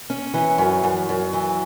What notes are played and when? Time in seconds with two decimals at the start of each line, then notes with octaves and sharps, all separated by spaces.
0.10 C#4
0.34 E3
0.58 F#2
0.84 F#2
1.09 F#2
1.33 E3